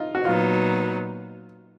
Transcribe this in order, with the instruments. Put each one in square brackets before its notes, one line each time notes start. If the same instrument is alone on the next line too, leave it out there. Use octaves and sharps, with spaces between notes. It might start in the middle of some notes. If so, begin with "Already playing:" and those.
Already playing: [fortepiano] D#4 F4
F#4
[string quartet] A#2 F#3 B3 D#4 [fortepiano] F4